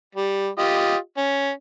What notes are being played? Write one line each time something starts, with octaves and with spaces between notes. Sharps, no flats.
G3
F4 G4 D#5
C#4